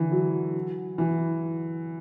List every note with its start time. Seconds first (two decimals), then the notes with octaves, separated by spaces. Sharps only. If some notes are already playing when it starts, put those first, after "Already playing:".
Already playing: D3 E3
0.11 F#3
0.98 E3